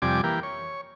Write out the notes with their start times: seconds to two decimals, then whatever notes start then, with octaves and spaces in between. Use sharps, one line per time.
0.02 F2 C3 G3 D5 G#5 D6
0.24 E3 A#3 G4
0.43 C#5